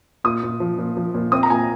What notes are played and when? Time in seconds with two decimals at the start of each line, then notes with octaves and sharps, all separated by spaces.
0.24 A#2 D#6
0.43 A#2
0.60 F3
0.78 A#2
0.97 F3
1.14 A#2
1.32 C4 D#6
1.43 A#5
1.50 A#2 G#5